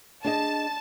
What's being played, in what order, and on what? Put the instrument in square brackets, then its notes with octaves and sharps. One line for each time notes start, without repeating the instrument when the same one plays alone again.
[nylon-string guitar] D4 G#4 D#5 [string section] A5